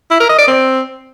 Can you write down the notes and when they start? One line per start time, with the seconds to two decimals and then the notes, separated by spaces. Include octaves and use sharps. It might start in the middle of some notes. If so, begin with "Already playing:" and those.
0.11 E4
0.20 A#4
0.29 D#5
0.38 D5
0.47 C4